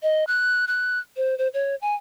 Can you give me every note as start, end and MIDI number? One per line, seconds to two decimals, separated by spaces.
0.03 0.24 75
0.27 0.65 90
0.67 0.99 90
1.17 1.36 72
1.38 1.48 72
1.54 1.75 73
1.81 1.94 80